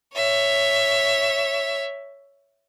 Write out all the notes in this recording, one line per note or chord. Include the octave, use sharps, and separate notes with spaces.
C#5 E5